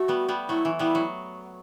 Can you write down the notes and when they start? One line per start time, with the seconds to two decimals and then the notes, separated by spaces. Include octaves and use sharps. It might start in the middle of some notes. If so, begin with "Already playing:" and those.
Already playing: A3 F#4
0.08 G3 B3
0.28 G3 B3
0.49 F#3 A3 E4
0.65 E3
0.79 G3 B3 E4
0.95 F#3